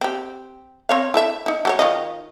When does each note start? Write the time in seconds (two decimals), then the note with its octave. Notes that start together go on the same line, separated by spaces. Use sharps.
0.01 C4 G4
0.89 C4 C#5 F5
1.14 E4 A4 E5
1.46 D#4 E4
1.65 F#3 A4 C#5
1.79 D#3 F4 D#5